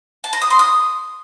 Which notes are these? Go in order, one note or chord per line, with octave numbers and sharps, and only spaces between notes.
A5
A#5
D#6
C6
D#6